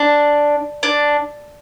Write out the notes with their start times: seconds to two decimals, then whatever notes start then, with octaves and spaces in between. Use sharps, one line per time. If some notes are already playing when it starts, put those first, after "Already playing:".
Already playing: D4
0.83 D4